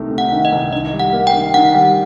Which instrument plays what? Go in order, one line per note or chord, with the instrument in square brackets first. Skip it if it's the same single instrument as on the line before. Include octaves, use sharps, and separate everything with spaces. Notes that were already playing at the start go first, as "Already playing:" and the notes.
Already playing: [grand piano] C2 C3 D#3 A3
C3
[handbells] F#5
[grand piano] D#3
[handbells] D#5
[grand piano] C2
[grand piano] D#3 [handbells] D#5
[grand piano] G3
[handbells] F#5
[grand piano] A#3
[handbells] G5
[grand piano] D#3
[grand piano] D#3 [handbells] F#5
[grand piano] G3